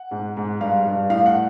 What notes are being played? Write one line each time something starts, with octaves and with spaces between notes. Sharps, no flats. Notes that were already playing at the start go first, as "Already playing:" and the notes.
Already playing: F#5
G#2
G#2
G2 F5
G2
A2 F5
F#5